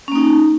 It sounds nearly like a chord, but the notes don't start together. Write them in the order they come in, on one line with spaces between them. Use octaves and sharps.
C#4 A#3 D#4